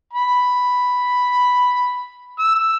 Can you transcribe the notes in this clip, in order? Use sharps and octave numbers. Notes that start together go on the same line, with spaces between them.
B5
E6